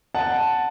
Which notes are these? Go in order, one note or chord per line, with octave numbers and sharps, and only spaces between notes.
F#5 A5